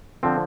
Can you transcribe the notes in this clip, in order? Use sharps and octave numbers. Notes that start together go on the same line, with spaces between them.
D3 F3 C4